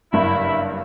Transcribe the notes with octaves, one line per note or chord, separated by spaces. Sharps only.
F#1 G2 E4